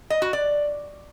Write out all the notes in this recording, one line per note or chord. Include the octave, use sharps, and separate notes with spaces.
D#5
F#4
D5